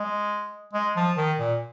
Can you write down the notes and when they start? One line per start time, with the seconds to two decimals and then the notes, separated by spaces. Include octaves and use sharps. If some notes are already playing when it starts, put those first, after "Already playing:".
Already playing: G#3
0.73 G#3
0.96 F3
1.17 D#3
1.39 A#2